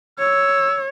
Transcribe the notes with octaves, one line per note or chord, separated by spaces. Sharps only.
C#5 E6